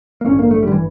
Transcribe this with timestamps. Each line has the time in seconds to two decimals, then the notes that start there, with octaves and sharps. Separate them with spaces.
0.21 A#3
0.26 A1 G2 D3 C#4
0.39 A#3
0.51 A3
0.63 G3
0.68 D3
0.72 E3